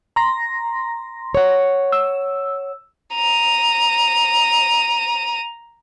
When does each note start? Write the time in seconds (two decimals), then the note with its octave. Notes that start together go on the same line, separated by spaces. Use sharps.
0.16 A#5 C6 A#6
1.35 C#5 F#5
1.92 E6
3.15 A#5 D#7